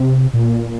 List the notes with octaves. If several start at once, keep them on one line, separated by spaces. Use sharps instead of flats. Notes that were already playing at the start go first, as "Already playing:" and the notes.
Already playing: C3
A#2